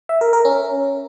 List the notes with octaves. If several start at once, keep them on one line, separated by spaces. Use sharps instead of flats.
E5
A#4
A#4
C#4